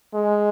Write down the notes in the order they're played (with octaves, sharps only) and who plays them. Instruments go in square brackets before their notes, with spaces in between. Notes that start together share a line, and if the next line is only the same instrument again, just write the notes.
[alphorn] G#3